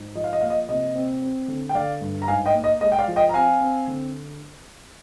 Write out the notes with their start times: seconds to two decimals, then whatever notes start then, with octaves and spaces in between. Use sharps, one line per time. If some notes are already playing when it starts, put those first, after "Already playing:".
Already playing: G#2
0.15 F3 D#5
0.24 F5
0.33 D#5
0.41 A#3 F5
0.50 D#5
0.69 C3 D#5
0.95 C4
1.22 C4
1.48 D3
1.69 G5
1.75 D3 D5 F5
2.01 G2
2.22 A#5
2.28 G#2 F5 G#5
2.46 D#5 G5
2.54 A#3
2.64 D#5
2.81 G#3 D#5
2.92 G5
2.99 D5 F5
3.08 F3
3.16 D#5 G5
3.29 A#5
3.34 C4 F5 G#5
3.61 C4
3.87 D3